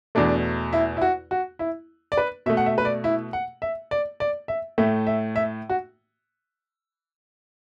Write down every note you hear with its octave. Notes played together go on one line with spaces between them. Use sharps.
E2 B2 A3 D4
E4
E4
F#4
F#4
E4
D5
B4
B2 A3 E5
F#5
E5
B4
D5
E4
F#5
E5
D5
D5
E5
A2 A3 E5
E5
E5
F#4